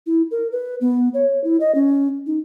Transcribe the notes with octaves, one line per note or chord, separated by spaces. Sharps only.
E4
A#4
B4
B3
C#5
E4
D#5
C#4
D#4